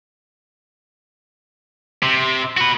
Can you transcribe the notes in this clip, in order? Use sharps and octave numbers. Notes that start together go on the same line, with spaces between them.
C3
F#4 B4